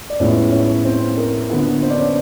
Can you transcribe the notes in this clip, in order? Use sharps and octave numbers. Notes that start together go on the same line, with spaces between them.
D5
A2 F3 G#3 B3 C#4 C#5
C#4 C#5
C4 C5
A#4
D3 F3 A#3 B3 B4
C4 C5
D4 D5
C#4 C#5